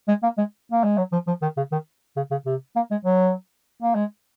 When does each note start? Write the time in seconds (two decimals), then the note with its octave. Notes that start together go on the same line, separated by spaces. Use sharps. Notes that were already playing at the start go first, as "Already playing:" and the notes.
0.08 G#3
0.23 A#3
0.38 G#3
0.72 A#3
0.84 G#3
0.97 F#3
1.12 F3
1.27 F3
1.42 D#3
1.57 C#3
1.72 D#3
2.16 C#3
2.31 C#3
2.46 C3
2.76 A#3
2.91 G#3
3.05 F#3
3.82 A#3
3.95 G#3